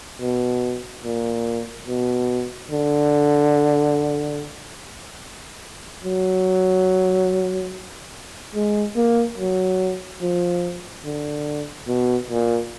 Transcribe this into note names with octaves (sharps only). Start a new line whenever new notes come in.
B2
A#2
B2
D3
F#3
G#3
A#3
F#3
F3
D3
B2
A#2